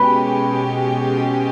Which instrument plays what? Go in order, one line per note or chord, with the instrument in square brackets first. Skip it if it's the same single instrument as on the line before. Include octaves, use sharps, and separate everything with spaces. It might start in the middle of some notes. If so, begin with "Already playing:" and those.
Already playing: [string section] B2 G#3 C#4 G4 [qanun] B4